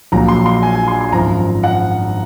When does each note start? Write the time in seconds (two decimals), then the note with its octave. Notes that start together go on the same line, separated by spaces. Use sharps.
0.12 A#1 A#2 F#3 A#5
0.28 C6
0.46 C6
0.63 G#5
0.75 G#5
0.88 C6
1.01 C6
1.12 G#1 F#2 F3 A#5
1.63 F#5